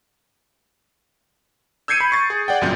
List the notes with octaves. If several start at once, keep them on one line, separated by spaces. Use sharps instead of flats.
E6 G6 G#6 C7 C#7 D#7
B5
C#6 A6
G#4
D5 F#5 G5
G1 F#2 A#2 G6